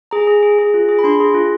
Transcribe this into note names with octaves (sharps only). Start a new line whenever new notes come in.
G#4 A#5
G#4
G#4
G#4
F4
G#4
B5
D4 C6
G#4
F4